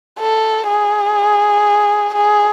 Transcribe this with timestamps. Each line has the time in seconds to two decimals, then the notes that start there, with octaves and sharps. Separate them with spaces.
0.20 A4
0.68 G#4
2.14 G#4